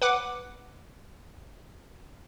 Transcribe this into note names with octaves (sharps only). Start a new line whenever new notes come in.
B4 F#5 D6